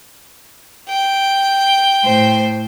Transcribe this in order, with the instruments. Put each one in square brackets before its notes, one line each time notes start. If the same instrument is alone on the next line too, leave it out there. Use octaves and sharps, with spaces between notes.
[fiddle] G5
[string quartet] A2 C5